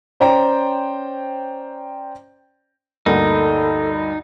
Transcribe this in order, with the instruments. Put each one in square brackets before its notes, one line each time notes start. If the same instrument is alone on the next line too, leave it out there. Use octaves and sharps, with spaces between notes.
[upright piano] C#4 C5 D5 G5 A#5
[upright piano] D2 G2 A#3 [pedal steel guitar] D#4 [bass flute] A4